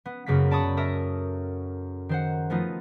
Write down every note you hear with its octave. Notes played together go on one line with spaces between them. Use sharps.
B3
F#2 C#3 A#3 B3 B6
D5 A5 B5 C#6 D#6
A4 A#4 E5 D#6
D#3 C5 F#5
F3 A3 B3 D#4 F4